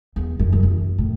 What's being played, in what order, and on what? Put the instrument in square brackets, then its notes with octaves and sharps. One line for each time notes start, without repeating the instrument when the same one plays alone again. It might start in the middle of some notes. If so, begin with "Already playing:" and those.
[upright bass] E2
F#2
E2
F#2
A2